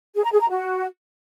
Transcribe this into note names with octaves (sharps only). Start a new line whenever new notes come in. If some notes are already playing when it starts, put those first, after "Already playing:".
G#4
A#5
G#4
A#5
F#4